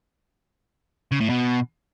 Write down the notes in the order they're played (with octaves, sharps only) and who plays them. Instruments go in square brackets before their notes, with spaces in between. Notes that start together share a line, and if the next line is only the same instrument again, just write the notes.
[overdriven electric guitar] C#3
A2
B2